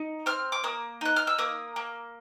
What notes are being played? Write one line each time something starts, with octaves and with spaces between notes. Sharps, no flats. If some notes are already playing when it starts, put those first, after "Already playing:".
Already playing: D#4
C4 F6
D6
A#3 D#6
D#4 F#6
F6
E6
A#3 D#6
A#3